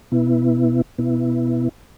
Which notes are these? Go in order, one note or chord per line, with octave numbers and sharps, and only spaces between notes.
B2 B3 E4
B2 B3 E4